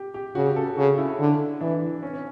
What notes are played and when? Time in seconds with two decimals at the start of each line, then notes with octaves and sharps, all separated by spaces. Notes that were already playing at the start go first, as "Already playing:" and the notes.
Already playing: G4
0.14 G4
0.35 C#3 F#4
0.46 G4
0.56 A4
0.67 A4
0.77 C#3 F#4
0.98 E4
1.19 D3
1.61 E3 D4
2.03 C#4
2.13 C#4